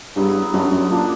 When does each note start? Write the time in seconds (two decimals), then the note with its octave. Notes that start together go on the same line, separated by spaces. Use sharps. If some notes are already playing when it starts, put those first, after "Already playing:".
0.15 G2 C#3 F#3 B3 E4
0.53 F#2 D3 G3 B3 F#4
0.71 F#2
0.90 A#2 D3 A#3 D4